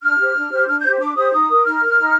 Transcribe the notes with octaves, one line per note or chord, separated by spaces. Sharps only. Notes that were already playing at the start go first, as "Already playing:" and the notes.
D4 F6
G4 C5
D4
G4 C5
D4 F6
G6
G4 C5
D4 D6
G4 C5 D#6
D#4 D#6
A#4
D#4 F6
A#4
D#4